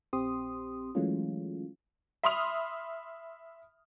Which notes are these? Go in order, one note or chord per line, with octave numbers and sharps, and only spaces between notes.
A#1 C4 G4 C6 D#6
E3 F#3 G#3 A3 C#4 F4
E5 B5 C6 D#6 F6 F7